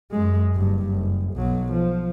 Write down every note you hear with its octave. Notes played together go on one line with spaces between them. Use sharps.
F#2 G#3
F#1 G2
F#1
B1 F#3
F3